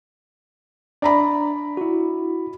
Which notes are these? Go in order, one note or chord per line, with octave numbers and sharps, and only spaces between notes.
D4 D5 A#5 B5
E4 F#4